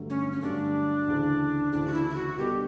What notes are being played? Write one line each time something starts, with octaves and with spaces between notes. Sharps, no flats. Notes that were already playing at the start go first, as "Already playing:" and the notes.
Already playing: G2 D3 F#3 A3
C#4
C#4
G2 D3 F#3 A3 D4
D2 C#3 E3
D2 C#3 E3 D4
F#4
E4
E4
F#4
B2 G3 D4 G4 A4